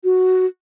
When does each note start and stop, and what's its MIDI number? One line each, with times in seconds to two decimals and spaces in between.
0.04 0.46 66